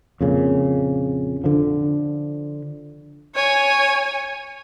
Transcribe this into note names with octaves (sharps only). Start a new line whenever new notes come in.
F2 A#2 C#3
D3 F3
C#5 G#5